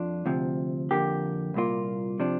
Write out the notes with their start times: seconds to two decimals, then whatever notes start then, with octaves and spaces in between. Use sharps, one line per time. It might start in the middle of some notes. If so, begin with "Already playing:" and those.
Already playing: F2 D4 F4
0.26 D2 C3 F3
0.91 F2 D3 A#3 G4
1.54 C2 A#2 A#3 F4
2.20 C3 F3 D4